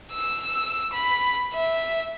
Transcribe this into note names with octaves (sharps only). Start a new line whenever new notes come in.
E6
B5
E5